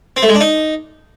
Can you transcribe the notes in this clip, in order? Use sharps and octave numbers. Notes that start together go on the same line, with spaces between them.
C4
A3
G#3
D4
D#4